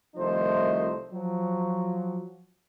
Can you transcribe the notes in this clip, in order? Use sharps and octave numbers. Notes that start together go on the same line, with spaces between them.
C2 D#3 F3 A3 D#4 C5
F3 F#3